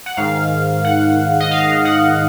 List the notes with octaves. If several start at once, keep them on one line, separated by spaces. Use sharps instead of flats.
F#5
G#2 D#3 F5
F#5
D#5
F5
F#5